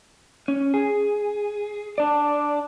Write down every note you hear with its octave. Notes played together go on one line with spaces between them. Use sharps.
C#4
G#4
D4 D5